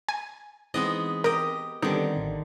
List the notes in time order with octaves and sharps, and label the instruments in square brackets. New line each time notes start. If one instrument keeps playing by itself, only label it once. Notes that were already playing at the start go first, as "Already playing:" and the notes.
[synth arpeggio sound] G#5
[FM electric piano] E3 C4 D#4 [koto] G#3 B3 D#5
[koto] G4 D#5 [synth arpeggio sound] A#4
[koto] D3 D#3 [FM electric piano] G3 B3 C4 [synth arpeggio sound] D#4
[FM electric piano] A1